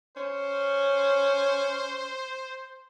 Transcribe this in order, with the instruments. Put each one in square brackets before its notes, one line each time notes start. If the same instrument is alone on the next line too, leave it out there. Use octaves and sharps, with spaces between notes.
[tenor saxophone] C#4 [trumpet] C5